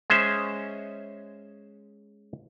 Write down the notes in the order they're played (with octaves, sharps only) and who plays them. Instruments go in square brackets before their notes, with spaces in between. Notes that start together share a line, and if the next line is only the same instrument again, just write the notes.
[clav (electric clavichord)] G#3 C#4 C5 E5